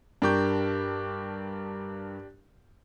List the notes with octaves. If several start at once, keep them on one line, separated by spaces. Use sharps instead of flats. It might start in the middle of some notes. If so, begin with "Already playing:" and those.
G2 D4 G4 A#4 C#6 G6